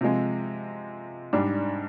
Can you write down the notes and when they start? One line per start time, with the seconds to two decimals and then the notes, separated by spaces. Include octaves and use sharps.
0.01 C3 F3 G#3
1.33 G#2 G3 D4